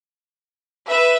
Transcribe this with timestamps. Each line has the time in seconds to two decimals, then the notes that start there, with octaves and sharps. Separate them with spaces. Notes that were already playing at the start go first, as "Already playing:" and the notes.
0.87 B4 E5